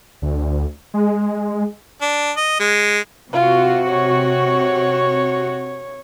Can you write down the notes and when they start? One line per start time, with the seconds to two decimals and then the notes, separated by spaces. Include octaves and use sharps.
0.22 D2
0.94 G#3
2.01 D4
2.37 D#5
2.60 G#3
3.33 C3 F4 F#4
3.89 C#5